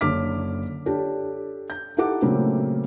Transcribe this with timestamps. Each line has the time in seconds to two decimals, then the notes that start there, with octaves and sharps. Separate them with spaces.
0.01 F#1 D3 C#5 D6 F6 B6
0.86 D4 G4 A4 C#5
1.70 G6
1.97 D#4 E4 G4 A4 F#5 D6
2.22 A#2 C#3 F#3 A3 A#3 C4